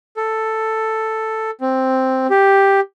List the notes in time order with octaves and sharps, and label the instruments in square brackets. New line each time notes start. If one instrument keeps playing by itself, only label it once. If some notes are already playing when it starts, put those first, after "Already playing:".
[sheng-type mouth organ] A4
C4
G4